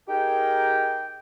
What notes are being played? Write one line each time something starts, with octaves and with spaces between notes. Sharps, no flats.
D#4 G4 G#4 A#4 G5